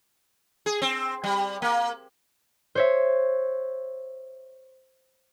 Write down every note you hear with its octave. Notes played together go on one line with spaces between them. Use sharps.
G#4
C4
G3
A#3
C5 C#5 E5